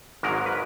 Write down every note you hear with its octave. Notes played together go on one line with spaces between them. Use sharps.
G#1 G#2 D#3 F#3 A#4
B4